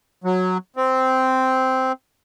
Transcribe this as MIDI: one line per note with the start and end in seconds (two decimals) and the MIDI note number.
0.24 0.58 54
0.77 1.92 60